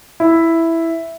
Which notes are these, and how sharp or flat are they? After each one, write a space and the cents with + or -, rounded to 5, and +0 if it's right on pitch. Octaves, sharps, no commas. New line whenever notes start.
E4 +0